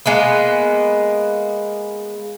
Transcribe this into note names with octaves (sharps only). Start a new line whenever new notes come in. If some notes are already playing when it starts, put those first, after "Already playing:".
G#3 A#3 B3